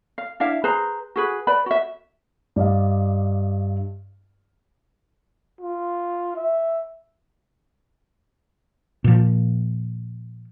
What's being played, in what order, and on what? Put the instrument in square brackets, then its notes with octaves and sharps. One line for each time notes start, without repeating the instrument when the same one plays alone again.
[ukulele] F5
D4 E4 E5 F5
G#4 B4 C5 A#5
F#4 G#4 B4
B4 D5 B5
F#4 E5
[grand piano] G2 D5 D#5 F5
[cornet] F4
E5
[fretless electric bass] A#2 F3